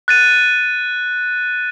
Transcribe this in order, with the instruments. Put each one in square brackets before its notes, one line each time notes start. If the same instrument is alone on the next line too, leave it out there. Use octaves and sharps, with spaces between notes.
[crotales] F#6 A6 D#7